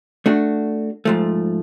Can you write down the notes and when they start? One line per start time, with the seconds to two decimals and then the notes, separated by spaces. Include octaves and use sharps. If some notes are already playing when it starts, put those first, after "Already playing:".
0.26 A3 D4 F#4
1.05 G#2 F3 A3